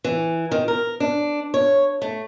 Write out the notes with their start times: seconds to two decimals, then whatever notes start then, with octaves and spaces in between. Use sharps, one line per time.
0.04 E3
0.51 D#3
0.68 A#4
1.00 D4
1.54 C#5
2.02 A3